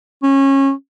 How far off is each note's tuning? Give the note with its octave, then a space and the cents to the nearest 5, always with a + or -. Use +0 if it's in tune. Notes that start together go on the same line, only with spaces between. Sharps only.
C#4 -25